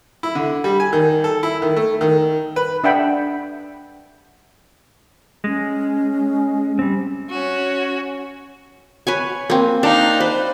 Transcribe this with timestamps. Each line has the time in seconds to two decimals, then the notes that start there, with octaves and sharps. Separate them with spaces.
0.23 E4
0.35 D3
0.64 G3
0.80 G#5
0.93 D#3
1.24 A4
1.43 E4
1.62 D#3
1.76 A3
2.01 D#3
2.56 B4
2.84 D4 E5 F#5 G5 B5
5.44 G#3 C#4
6.79 G3 C4
7.30 C#4 F#4
9.07 B4 C#5 G#5
9.50 A#3 C4
9.83 D4 D#4 F5
10.20 B4 C5